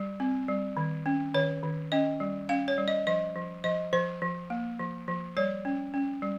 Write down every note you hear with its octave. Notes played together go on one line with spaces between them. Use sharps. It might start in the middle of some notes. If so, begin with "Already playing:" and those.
Already playing: G3
C4
G3
D#3
C#4
D#3 C#5
D#3
C#4 D#5
G3
C#4 F5
C#5
G3
D#5
F3 D#5
F3
F3 D#5
F3 C5
F3
A#3
F3
F3
G3 C#5
C#4
C#4
G3